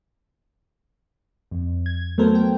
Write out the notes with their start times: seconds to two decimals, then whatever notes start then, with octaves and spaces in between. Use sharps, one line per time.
1.51 F2
1.86 G#6
2.18 F#3 A3 B3 A4 A#4 C5
2.35 G5